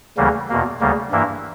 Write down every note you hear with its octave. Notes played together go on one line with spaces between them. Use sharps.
D2 C#3 E3 G3 A#3
E2 B2 A#3
D2 C#3 G3 A#3
G2 E3 A#3 E4